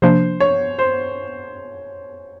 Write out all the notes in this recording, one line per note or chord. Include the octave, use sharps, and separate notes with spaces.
C3 F3 A#3 D4 C5
C#5
C5